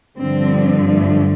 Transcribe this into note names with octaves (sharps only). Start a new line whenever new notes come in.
G2 D3 F3 C4
A3